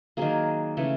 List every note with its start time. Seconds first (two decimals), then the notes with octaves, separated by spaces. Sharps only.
0.17 D#3 F#3 A#3 G#4
0.77 C#3 E3 A3